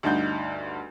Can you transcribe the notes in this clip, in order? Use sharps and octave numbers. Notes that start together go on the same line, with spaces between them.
D2 G2 D#4 F#5 G6